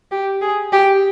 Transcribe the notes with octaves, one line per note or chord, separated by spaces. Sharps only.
G4
G#4
G4